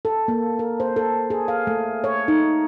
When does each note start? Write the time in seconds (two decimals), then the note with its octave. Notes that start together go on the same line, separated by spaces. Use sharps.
0.05 A4
0.28 A#3
0.59 A#4
0.80 C5
0.96 A4
1.30 G#4
1.48 F5
1.67 A3
2.04 C#5
2.28 D#4